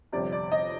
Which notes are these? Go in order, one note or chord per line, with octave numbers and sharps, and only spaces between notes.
G1 F2 C3 D5
D5
D#5